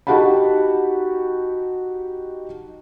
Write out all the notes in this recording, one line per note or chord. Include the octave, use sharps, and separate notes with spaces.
D#4 F#4 G4 F#5 A5 B5